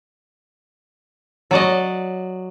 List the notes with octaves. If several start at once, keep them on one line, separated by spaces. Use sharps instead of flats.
F#3 D5 D#5